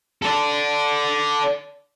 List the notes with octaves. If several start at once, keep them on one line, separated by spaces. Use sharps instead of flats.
A4 D5